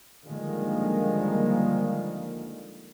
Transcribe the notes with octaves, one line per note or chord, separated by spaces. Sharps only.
D3 D#3 F3 G3 G#3 A#3